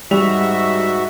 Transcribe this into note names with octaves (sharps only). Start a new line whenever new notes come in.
G#2 G3 F#4 E5 F7